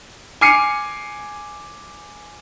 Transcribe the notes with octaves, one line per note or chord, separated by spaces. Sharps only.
G#5 D6 F6 C7 C#7 D#7